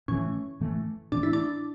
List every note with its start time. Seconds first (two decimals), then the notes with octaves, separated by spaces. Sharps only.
0.08 A2 E3 A3 C#4
0.61 A2 E3 A3
1.12 A2 E3 A3 D4
1.23 E4
1.33 D4